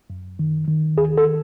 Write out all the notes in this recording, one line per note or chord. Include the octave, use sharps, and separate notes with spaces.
F#2
D#3
D#3
D#2 G#4
A4